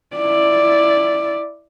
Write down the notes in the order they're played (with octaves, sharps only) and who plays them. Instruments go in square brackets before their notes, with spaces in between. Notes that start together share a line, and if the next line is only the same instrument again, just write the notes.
[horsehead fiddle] E4 D5